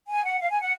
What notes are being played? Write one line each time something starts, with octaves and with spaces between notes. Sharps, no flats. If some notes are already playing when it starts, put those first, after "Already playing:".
G#5
F#5
F5
G#5
F#5